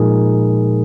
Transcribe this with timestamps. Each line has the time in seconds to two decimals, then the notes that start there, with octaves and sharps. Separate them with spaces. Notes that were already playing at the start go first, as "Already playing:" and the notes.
Already playing: A#2 F3 G#3 D#4 G#4 A#4